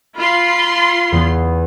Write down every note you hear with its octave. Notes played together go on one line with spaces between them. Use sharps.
F4 B5 C6
E2 B3 G#5